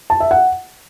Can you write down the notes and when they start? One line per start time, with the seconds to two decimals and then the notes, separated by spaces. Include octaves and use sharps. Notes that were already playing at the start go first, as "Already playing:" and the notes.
0.10 A5
0.20 E5
0.31 F#5